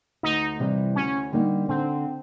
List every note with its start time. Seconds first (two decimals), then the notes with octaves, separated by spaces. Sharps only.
0.23 D2 D#4
0.59 C3 E3 G3
0.95 D2 C#4
1.32 D3 G3 A#3 D#4
1.68 D3 C4